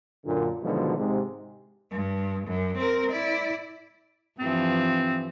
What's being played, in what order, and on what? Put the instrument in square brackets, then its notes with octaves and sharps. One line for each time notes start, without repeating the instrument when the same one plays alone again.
[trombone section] F#2 A#2 D3
B2 D3 D#3 F3 F#3 G#3
G#2 C3
[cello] G2
F#2
C4 A#4
E4 D5
[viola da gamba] G2 E3 F3 [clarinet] C4